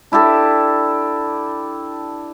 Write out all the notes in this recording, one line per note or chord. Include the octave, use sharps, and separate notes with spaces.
D4 E4 G4 A4